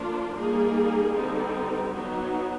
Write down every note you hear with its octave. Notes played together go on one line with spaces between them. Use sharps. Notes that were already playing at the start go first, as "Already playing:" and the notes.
Already playing: F3 A#3 D4 F4
G3 A#3 D#4 G#4
D3 G3 C4 D#4
F#3 B3 D#4